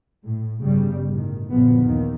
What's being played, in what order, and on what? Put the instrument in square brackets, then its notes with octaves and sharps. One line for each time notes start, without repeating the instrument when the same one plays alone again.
[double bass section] A2
G1 C#3 G3
A2 D#3
A#1 F#2 D3 F3 B3
D#2 D#3